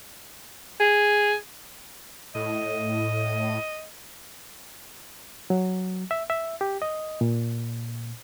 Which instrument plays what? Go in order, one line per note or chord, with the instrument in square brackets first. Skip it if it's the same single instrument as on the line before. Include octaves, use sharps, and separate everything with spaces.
[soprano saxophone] G#4
[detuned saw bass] A2 [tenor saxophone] D#5
[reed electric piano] F#3
E5
E5
G4
D#5
A#2